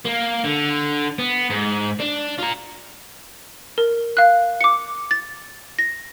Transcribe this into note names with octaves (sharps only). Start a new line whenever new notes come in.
A#3
D3
B3
G#2
D4
F4 A#5
A#4
F5 F#6
D6 C#7
A6
A#6